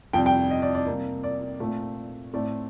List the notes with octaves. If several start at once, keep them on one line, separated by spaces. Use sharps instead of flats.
F2 C3 G3 G5
G5
D#5
D5
D5
C3 G3 A#3
D5
A#2 A3 C4
A2 A3 C4 D5